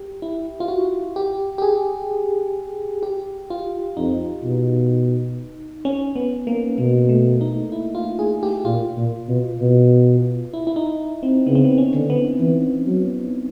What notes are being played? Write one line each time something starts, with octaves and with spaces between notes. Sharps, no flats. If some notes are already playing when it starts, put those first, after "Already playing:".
Already playing: G4
E4
F4
F#4
G4
G4
G#4
G4
F4
F2 D#4
B2
C#4
B3
A#3
B2 A#3
A3
D#4
E4
F4
G#4
G4
A#2 F4
A#2
B2
B2
E4
E4
D#4
C4
C#3 B3
C4
B3
C#4
D3
B3
E3
F#3